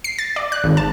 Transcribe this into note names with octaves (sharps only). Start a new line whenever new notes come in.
C7
A6
D5
F#6
G#1
A5